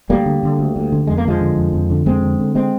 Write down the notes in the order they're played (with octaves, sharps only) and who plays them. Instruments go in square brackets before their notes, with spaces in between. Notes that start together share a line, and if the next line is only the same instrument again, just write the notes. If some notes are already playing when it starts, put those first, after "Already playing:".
[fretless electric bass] D2 G3 A#3
D3
D3
D2
D2
D3
F2 G#3
A#3
D3 F3 G#3
D3
F2
F2
D3
F2 G#3 C4
D3
D3
G#3 C4